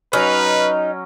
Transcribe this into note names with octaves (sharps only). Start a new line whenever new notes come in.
F#3 C#4 D#4 B4